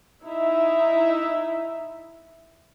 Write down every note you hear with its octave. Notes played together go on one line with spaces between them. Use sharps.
D#4 E4 E5